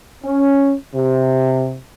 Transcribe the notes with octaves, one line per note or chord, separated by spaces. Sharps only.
C#4
C3